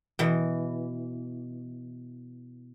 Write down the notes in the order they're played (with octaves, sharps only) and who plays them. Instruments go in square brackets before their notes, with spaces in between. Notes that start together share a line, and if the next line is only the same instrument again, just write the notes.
[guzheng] B2 E3